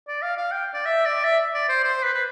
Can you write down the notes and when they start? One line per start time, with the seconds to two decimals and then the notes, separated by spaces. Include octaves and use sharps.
0.07 D5
0.22 F5
0.37 F5
0.52 G5
0.73 D5
0.85 E5
1.05 D5
1.24 E5
1.54 D5
1.69 C5
1.84 C5
2.03 B4
2.14 B4